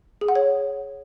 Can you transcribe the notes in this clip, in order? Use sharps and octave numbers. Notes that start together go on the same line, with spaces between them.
G#4
F#5
C#5